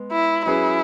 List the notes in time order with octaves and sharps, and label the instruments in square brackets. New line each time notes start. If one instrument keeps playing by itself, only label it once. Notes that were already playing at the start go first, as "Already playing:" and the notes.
Already playing: [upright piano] G#3 B3
[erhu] E4
[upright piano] F#3 C#4 G#4 B4 [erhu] E4